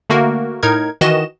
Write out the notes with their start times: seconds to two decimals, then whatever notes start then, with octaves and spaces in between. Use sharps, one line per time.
0.10 D3 A3 A#3 F#4 A#4
0.63 A2 D#4 A#4 G#6
1.01 D#3 E3 F#4 D#5 E7